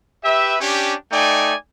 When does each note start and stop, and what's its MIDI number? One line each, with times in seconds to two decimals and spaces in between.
0.24 0.56 67
0.24 0.56 71
0.24 0.56 76
0.61 0.94 61
0.61 0.94 62
0.61 0.94 67
1.12 1.54 57
1.12 1.54 63
1.12 1.54 74
1.12 1.54 79
1.12 1.54 80